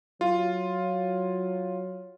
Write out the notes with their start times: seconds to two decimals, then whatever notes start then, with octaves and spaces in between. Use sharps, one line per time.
0.21 F#3 F4